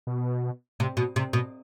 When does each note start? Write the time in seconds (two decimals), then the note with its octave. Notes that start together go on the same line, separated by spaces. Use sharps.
0.07 B2
0.80 C3
0.97 B2
1.16 C3
1.33 B2